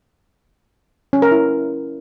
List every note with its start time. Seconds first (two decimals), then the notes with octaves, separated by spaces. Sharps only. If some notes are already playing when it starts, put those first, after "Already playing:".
1.13 C#4
1.22 A#4
1.32 E4